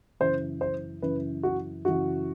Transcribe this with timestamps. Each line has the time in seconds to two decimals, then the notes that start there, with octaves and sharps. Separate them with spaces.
0.20 F#2 C#3 E3 C5
0.61 C5
1.02 F#2 C#3 E3 B4
1.43 F#4
1.85 F#2 C#3 E3 F#4